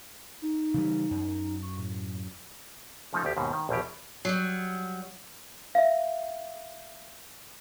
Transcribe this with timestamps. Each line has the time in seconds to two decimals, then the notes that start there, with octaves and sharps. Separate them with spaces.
0.42 D#4
0.74 C#3 E3 G3
1.11 F#2
1.63 C#6
1.78 A2
3.13 C#3 F3 A3 D#4
3.25 D2 G4
3.37 D#2 G#2 B2
3.53 D#3
3.69 A#1 E2 B2 G4
4.25 F#3 G3
5.75 E5 F5